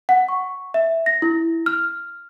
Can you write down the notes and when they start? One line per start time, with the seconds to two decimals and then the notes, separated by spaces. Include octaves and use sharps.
0.09 F#5
0.28 C#6
0.74 E5
1.06 A#6
1.22 E4
1.66 F6